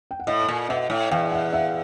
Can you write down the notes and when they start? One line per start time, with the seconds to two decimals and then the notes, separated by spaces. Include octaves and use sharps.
0.11 G5
0.20 F#5
0.27 A2 D#5 F5
0.48 A#2
0.69 B2 E5 F#5
0.90 A2
1.11 E2 F5 G5
1.32 E5 F#5
1.53 E5 F#5